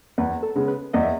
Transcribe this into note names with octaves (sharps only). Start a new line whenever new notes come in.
E2 B4
A4
C#3 G#3 B3
B4
E2 D#5
E5